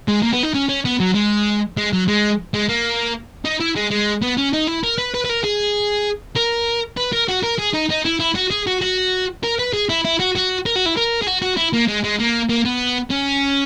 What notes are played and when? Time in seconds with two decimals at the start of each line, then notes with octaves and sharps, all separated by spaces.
0.08 G#3
0.23 A#3
0.33 B3
0.43 D#4
0.54 C#4
0.69 C#4
0.85 B3
1.00 F#3
1.15 G#3
1.77 G#3
1.93 F#3
2.08 G#3
2.54 G#3
2.69 A#3
3.45 D#4
3.60 E4
3.76 G#3
3.91 G#3
4.23 B3
4.38 C#4
4.53 D#4
4.67 E4
4.84 A#4
4.98 B4
5.14 B4
5.24 B4
5.29 A#4
5.44 G#4
6.36 A#4
6.97 B4
7.13 A#4
7.28 F#4
7.44 A#4
7.59 G#4
7.74 D#4
7.90 D#4
8.05 E4
8.20 E4
8.35 F#4
8.51 G#4
8.67 F#4
8.81 F#4
9.44 A#4
9.59 B4
9.73 G#4
9.89 E4
10.05 E4
10.20 F#4
10.36 F#4
10.66 A#4
10.76 F#4
10.86 E4
10.97 A#4
11.22 G#4
11.27 F#4
11.42 F#4
11.57 E4
11.73 A#3
11.88 G#3
12.04 G#3
12.19 A#3
12.50 A#3
12.65 B3
13.10 C#4